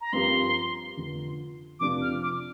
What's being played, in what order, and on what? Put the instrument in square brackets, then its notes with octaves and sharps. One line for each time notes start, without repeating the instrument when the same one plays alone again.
[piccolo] A#5
[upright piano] G2 F3 C4 G4 A#4 [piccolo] C6
[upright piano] F1 F2 D3
[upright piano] F1 F2 C3 F3 D4 [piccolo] D6
[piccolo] F6
D6